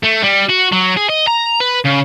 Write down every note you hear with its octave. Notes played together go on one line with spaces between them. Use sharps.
A3
G3
F#4
F#3
G#4
D#5
A#5
B4
C#3